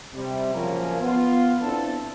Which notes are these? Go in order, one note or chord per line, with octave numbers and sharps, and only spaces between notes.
C3 G3
A#2 C#3 F3 F#3 A#3 C#4
B3 F4
C4 D4 E4 A4